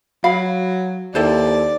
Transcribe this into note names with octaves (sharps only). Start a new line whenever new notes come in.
F#3 F5 B5
D#2 E4 A4 C5 D5